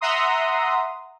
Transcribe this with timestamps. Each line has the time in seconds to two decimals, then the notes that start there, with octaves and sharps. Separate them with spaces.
0.01 E5 F#5 A#5 C6 D#6